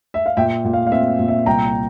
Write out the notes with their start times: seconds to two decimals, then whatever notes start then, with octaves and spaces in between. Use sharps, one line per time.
0.14 E5
0.26 F5
0.37 A#2 E5 G5
0.65 A#2
0.73 F5
0.87 F5
0.92 C4 E5
1.19 A#2
1.28 E5
1.46 C2 G5 A#5